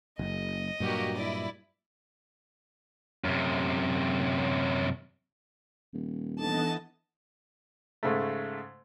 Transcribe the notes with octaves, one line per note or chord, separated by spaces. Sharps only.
F#1 D#5
G2 A#2 F#3 A#3 F#4 G4
E4 D5
F#2 C3
D#1
E3 B3 D4 D#4 A4 D#5 A5
G#2 C#3 A3